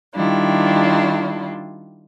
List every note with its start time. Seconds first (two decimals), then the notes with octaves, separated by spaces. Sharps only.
0.15 D#3 G3 D4 E4 F4